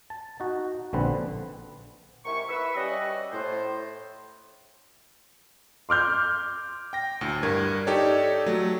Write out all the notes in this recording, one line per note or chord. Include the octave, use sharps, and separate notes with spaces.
A5
D#4 F#4
A#1 D3 C4 B4
G#2 C3 E4 A#4 C#6
B4 E5
G3 C#4 F#4 D#5
A2 C5
C6 D6 F6 G6
G5 A#6
D2 A2
G2 A#4 G#6
D#4 G4 A4 C#5 D5
F#3 A3